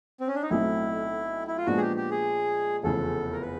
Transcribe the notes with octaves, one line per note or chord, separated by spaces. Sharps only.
C4
C#4
D4
D#4
B1 A2 F#3 A3 C4 E4
E4
F4
A#2 F3 G#3 B3 D4 F#4
G#4
G4
G4
G#4
F1 E2 C#3 F3 A4
A#4
B4